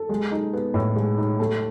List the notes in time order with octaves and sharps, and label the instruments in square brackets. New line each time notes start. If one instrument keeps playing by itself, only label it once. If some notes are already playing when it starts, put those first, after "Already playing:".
Already playing: [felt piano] A4
G#3
D#4
B3
A2
G#3
D#4
A3